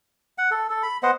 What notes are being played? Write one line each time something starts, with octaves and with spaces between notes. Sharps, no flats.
F#5
A4
A4
B5
B3 C5 D#5 F#5